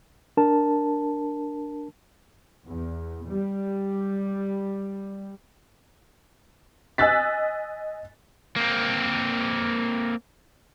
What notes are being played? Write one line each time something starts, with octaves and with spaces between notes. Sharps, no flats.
D4 A#4 A5
E2
G3
D#5 G#5 E6 F#6 A6 B6
A#3 C4